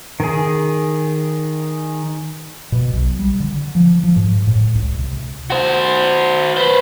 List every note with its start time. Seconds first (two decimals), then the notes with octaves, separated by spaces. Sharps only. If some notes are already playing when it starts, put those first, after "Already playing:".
0.20 D#3 G#4
2.72 B2
2.93 B1
3.19 G3
3.40 D3
3.75 F3
4.03 F3
4.16 G#2
4.47 A2
4.75 C#2
4.99 C3
5.50 F#4 C5
6.57 B4 C5